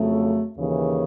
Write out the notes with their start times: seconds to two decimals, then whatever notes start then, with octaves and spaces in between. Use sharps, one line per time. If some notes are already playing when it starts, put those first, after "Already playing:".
Already playing: F2 C#3 F#3 A3
0.57 D#2 C#3 E3